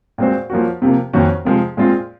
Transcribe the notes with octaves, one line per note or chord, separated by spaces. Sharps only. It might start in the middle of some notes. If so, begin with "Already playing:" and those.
A#2 G#3 C4 F#4 C5
F3 A#3 C#4 F#4
C3 F3 A#3
F2 D#3 A#3 C#4 F#4
C3 F3 G#3
A#2 G#3 C4 F4